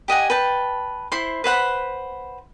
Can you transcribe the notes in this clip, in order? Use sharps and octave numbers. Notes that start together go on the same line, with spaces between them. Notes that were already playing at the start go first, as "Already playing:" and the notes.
G4 D#5 F#5 G#5
B4 G5 A5
E4 C5 C6
B4 C5 F#5 B5